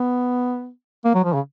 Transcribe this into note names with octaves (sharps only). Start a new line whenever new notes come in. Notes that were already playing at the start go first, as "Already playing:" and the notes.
Already playing: B3
A#3
F#3
F3
C#3